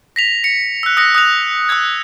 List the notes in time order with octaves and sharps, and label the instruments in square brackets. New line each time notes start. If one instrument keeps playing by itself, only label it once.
[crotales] A#6 B6 F7
C#7
E6 F#6
D#6 F#6 A#6 C#7
D#6 F#6 F7
D#6 E6 F#6 G#6